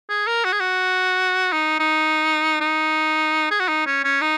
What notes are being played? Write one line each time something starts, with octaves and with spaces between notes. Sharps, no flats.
G#4
A#4
F#4
G#4
F#4
D#4
D#4
D#4
G#4
F#4
D#4
C#4
C#4
D#4